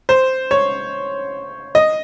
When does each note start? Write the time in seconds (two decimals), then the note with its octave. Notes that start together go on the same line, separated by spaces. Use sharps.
0.09 C5
0.51 C#5
1.75 D#5